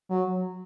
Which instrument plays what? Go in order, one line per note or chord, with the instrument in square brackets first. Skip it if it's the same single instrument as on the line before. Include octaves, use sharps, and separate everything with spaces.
[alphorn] F#3